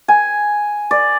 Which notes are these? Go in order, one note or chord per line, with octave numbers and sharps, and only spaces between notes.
G#5
D5